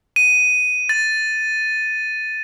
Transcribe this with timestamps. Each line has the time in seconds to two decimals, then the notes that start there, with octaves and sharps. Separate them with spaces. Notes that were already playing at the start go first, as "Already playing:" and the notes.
0.16 D#7
0.89 A6